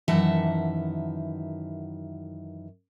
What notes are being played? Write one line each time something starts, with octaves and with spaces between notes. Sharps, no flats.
F#2 D#3 E3 E5 F#5 A5